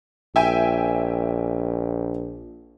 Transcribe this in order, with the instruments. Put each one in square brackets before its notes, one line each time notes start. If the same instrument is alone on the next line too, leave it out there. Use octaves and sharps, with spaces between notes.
[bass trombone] A#1 [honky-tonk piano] E5 G5 G#5